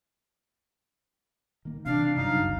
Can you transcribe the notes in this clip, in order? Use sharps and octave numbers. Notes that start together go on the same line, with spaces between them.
D#3 A#3
C3 E3 D4 F5
G2 C#3 F#3 D#4 F5
F1 C2 F#2